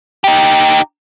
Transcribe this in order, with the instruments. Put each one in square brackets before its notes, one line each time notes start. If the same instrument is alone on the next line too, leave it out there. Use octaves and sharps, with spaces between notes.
[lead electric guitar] D#4 G4